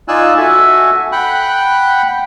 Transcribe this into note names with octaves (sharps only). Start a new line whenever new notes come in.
D#4 F4 D5 G#5 E6 F#6
F#4 A4 E5 G#5
F#5 G5 B5 F#6